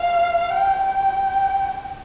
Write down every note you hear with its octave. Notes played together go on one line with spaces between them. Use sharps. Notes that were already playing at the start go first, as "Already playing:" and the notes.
Already playing: F5
G5
G5